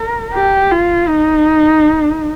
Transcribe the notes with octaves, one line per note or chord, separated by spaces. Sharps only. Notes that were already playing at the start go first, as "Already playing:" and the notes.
Already playing: A#4
G4
F4
D#4